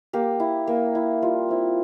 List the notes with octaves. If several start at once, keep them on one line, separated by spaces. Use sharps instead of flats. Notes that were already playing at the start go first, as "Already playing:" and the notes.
A#3 G4
E4
A#3
E4
G3 F4
C4 E4